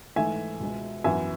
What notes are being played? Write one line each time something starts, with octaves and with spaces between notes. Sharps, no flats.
G#2 E3 A3 E5 G#5
C#2 B2 G#3
F#2 E3 B3 E5 G#5